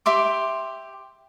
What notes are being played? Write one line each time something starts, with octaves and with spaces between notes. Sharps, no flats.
G4 E5 C6 D6